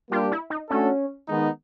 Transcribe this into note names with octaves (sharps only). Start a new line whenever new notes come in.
G3 A#3 D4 F4 G4
E4
D#4
A3 C#4 D4 F#4 A4
D#3 G#3 B3 D#4